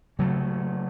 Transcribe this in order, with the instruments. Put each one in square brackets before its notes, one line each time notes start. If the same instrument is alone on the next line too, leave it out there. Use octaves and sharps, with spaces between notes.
[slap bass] C#3 F#3 A3